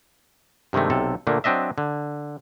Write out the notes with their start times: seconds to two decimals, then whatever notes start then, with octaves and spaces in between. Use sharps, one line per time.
0.73 G2 C3 D#3 G#3 A3
0.90 B1 C3 A4
1.27 A#2 D3 A3 A#3
1.44 F#3 C4 D4 D#5 E5
1.78 D3